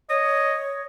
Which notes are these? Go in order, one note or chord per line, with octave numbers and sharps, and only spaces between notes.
C#5 D#5